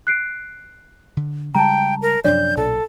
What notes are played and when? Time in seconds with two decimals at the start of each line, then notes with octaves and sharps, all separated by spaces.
0.07 F#6 C7 D7
1.17 D3
1.55 C#3 G3 G#3 G5 A5 A#5
2.02 A#4
2.24 F#2 C3 F3 D4 C#5 D5 G6
2.57 B1 A#2 A4